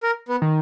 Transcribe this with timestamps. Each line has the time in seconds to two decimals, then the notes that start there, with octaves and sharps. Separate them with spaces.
0.03 A#4
0.29 B3
0.42 D#3